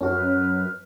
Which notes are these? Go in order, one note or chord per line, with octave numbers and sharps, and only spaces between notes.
F#2 C#4 F#4 B4 F6